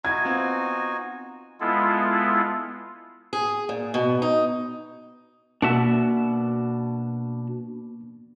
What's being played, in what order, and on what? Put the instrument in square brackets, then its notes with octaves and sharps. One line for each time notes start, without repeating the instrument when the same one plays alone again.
[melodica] D#4 F#4 G#5 [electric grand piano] E4 [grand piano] G#6
[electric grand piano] B3 C4 F4
[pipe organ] G#3 B3 E4 F4 A4
[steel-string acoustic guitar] G#4
A#2
B2
D#4
[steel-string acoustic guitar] B2 [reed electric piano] A#3 [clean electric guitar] D4 F#4 E5